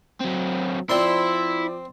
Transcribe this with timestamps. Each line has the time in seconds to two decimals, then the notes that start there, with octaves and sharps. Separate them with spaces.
0.20 F#3 C4
0.89 F3 C4 E4 D5 C6 G7